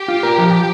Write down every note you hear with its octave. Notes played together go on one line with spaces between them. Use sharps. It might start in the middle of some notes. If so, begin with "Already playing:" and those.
Already playing: G4
F4
A#4
F3